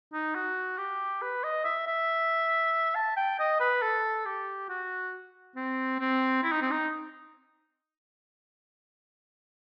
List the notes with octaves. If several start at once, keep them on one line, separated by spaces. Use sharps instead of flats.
D#4
F#4
G4
B4
D#5
E5
E5
A5
G5
D#5
B4
A4
G4
F#4
C4
C4
E4
D#4
C4
D#4